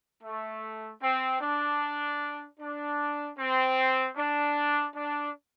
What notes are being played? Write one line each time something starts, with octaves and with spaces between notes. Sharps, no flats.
A3
C4
D4
D4
C4
D4
D4